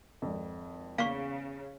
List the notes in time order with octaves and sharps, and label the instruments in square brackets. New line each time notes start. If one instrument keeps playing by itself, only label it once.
[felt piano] G#1 F2
[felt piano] E2 B6 [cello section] C#3 [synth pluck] A#3 [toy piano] F5 C#6